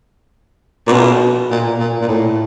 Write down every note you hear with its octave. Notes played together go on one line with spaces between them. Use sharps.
A#2
B2
A#2
A#2
A#2
A2